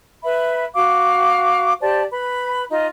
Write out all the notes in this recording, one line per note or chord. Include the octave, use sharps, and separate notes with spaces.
B4 E5 B5
F#4 F5 D6
G4 C5 D5 A5
B4 B5
D#4 F4 D#5